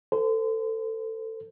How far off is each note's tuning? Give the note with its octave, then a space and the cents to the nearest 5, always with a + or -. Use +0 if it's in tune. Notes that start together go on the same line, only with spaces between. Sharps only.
A4 +20 C5 -35